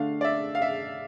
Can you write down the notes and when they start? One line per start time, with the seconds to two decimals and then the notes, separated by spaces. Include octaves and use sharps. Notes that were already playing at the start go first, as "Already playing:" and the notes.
Already playing: D3 A3 D4 F5
0.21 D5
0.24 E5
0.55 F5
0.62 E5